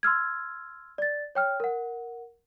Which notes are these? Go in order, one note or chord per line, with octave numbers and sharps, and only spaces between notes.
C6 E6 F6 G#6
D5 A6
C#5 G5 F6
A#4 F#5